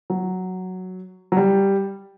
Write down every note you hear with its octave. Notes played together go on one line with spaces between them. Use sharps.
F#3
F#3
G3